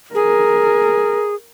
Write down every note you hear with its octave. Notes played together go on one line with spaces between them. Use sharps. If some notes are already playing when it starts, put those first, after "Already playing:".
G#4 A#4